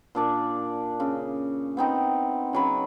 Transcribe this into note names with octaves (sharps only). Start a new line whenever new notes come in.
A#2 D4 D5
C#3
B3 C4 D#4
C#3 F#3 B5